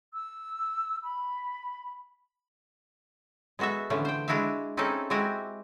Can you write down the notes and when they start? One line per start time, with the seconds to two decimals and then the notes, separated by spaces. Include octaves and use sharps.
0.14 E6
1.03 B5
3.59 G#3 B3 F#4 A4 E5
3.90 D3 E3 F3 A3 C#4
4.05 C5 G5
4.28 G#3 D4 E4 F#4 E5 F5
4.77 C4 C#4 D#4 E4 G#4 A4
5.10 G#3 C4 E4 F#4 G4 G#5